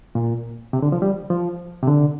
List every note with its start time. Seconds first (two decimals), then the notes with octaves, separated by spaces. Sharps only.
0.15 A#2
0.73 C3
0.82 D3
0.92 F3
1.02 G3
1.30 F3
1.83 C3
1.88 D3